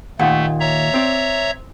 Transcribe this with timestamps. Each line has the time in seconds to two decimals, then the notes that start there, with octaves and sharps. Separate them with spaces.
0.19 D#2 A#2 A3 F#5
0.60 C#5 E5 A#5
0.94 C4 D5